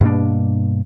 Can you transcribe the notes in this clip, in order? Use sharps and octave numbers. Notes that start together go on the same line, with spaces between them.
G2 B2 A#3 D4